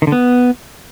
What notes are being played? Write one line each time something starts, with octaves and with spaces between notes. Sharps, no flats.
D#3
D3
B3